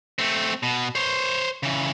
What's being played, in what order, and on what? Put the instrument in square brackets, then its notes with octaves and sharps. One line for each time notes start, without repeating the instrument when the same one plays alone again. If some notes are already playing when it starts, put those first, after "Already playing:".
[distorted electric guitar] A3 C4
B2
C5 C#5
C#3 E3